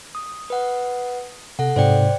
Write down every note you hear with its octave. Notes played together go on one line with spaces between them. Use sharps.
D#6
B4 F#5
C3 A4 F#5
G#2 C3 C5 D5 G5